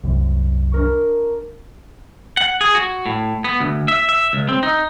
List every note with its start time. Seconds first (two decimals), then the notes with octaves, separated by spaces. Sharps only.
0.03 C2 F#2
0.72 D4 A#4 C#6
2.37 F#5
2.61 G#4
2.75 F#4
3.06 A2
3.44 B3
3.60 D2
3.88 E5
4.09 E5
4.33 C#2
4.49 C4
4.63 D#4